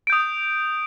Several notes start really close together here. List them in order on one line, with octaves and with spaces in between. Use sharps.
D7 G6 D#6